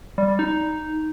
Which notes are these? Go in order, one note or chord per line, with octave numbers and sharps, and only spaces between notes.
G3
G3
D#4